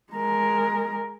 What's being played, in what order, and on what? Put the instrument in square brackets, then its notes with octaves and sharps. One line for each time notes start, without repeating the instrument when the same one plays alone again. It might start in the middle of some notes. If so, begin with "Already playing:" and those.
[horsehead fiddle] G#3 A#4